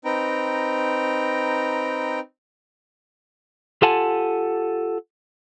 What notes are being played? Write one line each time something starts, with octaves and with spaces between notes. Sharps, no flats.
C4 D#4 B4 G5 A#5
F4 G4 A4 F#5 G#5 A5